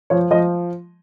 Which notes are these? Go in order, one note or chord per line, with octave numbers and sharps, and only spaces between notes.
F3 C#5
F3 D#5